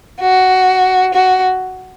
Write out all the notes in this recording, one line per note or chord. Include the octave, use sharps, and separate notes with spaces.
F#4
F#4